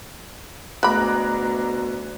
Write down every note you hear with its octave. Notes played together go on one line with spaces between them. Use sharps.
D2 B2 G#3 A#5 B5 D6 F#6